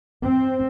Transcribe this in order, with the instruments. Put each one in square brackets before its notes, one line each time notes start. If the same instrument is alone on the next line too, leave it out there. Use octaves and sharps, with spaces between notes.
[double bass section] C4